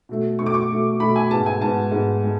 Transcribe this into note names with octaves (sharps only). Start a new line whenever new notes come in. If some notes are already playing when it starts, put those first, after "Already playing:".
B2 A3
B2 A3 C#6
D6
C#6
B2 A3
B2 A3 B5
G#5
G#2 G#3 B3 A5
G#5
G#2 G#3 B3 A5
G#2 G#3 B3
G#3